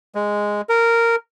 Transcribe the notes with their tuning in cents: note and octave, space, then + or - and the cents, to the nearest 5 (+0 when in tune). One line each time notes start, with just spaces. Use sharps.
G#3 -5
A#4 -10